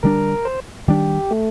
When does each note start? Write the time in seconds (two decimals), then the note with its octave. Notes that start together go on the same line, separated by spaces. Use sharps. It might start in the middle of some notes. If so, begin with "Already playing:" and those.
0.03 D3 G3 D4 A#4
0.45 C5
0.88 D#3 G3 D4 G4
1.31 A3